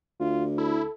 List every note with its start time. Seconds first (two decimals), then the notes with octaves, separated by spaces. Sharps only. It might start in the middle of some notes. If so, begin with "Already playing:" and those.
0.20 D2 F4
0.58 E4 A4